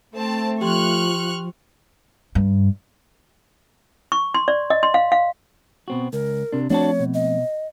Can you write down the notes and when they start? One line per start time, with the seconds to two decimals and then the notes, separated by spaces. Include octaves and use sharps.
0.13 A3 C4 A5
0.61 F3 G4 G5 C6 C#6 F6 F#6
2.35 G2
4.12 C#6
4.34 C6
4.48 D5
4.70 D#5
4.83 C6
4.94 F5
5.12 F5
5.88 B2 C4 F#4
6.13 C#2 A#4
6.53 C3 D4
6.70 F3 A3 C4 D4 F#4 C#5 A5
7.00 B2
7.14 D#5